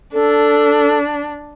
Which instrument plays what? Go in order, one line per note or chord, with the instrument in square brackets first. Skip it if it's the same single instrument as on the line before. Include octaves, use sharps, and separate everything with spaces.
[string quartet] D4 [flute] A4